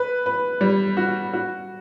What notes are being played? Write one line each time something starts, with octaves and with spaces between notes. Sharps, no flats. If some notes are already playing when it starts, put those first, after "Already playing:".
Already playing: B4
B4
G3
F#4
F#4